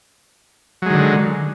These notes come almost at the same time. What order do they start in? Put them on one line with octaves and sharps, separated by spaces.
F#3 G#3 D#3 D3